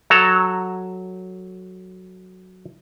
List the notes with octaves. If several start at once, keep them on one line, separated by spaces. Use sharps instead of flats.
F#3 A4 A#5